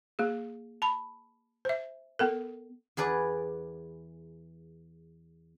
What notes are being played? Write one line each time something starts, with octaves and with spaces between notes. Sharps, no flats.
A#3 G#4
A5 B5
C5 E5
B3 A4 A#4
E2 G#4 B4 D5